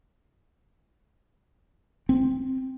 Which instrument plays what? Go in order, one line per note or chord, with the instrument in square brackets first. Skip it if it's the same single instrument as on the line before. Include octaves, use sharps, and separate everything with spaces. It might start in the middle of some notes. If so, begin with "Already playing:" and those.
[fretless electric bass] C4